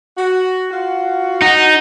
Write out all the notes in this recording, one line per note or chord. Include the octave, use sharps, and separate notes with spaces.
F#4
F4 F#4
D#4 F#4